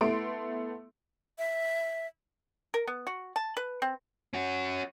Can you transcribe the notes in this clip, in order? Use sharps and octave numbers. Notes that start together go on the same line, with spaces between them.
A3 B3 E4 C6 D7
E5
A#4
B3
F#4
A5
B4
C4
C#4 F#4